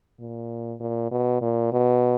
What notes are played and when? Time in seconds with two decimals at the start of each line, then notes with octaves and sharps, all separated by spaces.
0.20 A#2
0.80 A#2
1.11 B2
1.41 A#2
1.72 B2